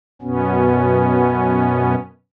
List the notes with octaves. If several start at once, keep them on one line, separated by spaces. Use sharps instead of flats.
F#2 B2 B3 C#4